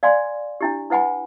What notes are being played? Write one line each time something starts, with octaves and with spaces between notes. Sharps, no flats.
D5 F5 G#5 C6
D4 E4 G4
E4 B4 F#5 G#5 B5